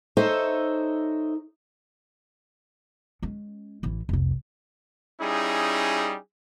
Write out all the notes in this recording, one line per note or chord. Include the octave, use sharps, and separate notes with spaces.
D#4 A4 C5 C#5 D#5 E5
G#3 C#4
A1 E3
F1 C2
G3 C#4 D#4 E4 G#4